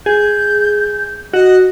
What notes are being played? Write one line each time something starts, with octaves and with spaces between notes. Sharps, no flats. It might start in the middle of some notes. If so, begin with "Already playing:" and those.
G#4 G6
F#4 D#5